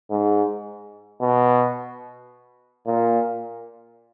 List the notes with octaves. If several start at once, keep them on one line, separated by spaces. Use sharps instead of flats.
G#2
B2
A#2